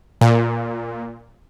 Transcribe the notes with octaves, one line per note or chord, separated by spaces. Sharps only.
A#2